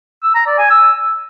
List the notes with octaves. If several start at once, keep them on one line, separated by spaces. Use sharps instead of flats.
E6
A#5
D5
G#5
E6